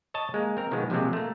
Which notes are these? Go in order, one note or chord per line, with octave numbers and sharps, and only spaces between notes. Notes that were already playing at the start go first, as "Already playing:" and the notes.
C#5 D#5 A5
G#3 A#3
C4 A#4
B2 D#3 F3 F#3 G#3 B3
A#1 C3 F3 F#3 G#3 C4
A3 A#3